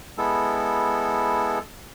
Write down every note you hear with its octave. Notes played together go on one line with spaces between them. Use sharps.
G#3 B3 E4 A4